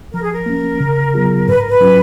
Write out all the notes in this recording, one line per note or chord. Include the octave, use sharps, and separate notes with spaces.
F3 A#4
G#4
A#4
A#3 C#4
C#3
F#3 B3 F4 G#4
G#2 B4
A#4
B4
F#3 C#4 F4